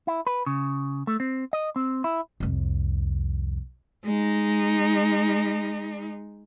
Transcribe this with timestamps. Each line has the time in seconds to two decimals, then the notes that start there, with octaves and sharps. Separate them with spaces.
0.07 E4
0.27 B4
0.46 C#3
1.07 A3
1.20 C4
1.53 D#5
1.76 C4
2.04 E4
2.40 C2 F2
4.05 G#3 D#4